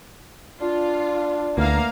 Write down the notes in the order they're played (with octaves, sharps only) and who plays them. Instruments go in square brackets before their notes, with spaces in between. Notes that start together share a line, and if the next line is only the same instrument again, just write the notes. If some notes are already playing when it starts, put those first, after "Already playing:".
[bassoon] D4 [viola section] F4
[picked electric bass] D2 [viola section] A#3 F5 A#5 [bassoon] B3